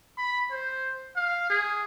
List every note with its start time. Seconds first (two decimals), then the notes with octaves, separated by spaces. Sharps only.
0.17 B5
0.51 C5
1.16 F5
1.50 G#4